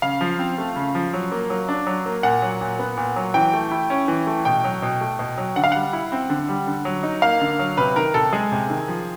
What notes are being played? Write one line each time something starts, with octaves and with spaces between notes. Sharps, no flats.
C#3 F5
F3
C4
A3
C#3
F3
F#3
A#3
F#3
D4
F#3
A#3
A#2 F#5
F#3
A#2
B3
A#2
F#3
E3 G5
A3
E4
C#4
E3
A3
B2 G5
F#3
B2
A3
B2
F#3
D3 F#5
F5
G3 F#5
E4
C4
D3
G3
D3
F#3
D#4
A#3 F5
D3
F#3
C3 B4
D#3 A#4
C3 A4
G#3 G#4
C3
D#3
F3